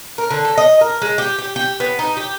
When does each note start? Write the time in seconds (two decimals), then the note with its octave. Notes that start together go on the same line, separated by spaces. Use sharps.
0.18 A#4
0.31 D3
0.45 A4
0.58 D#5
0.81 A#4
1.02 G#3
1.18 G4
1.39 G4
1.56 G4
1.80 B3
1.99 D#4
2.17 G4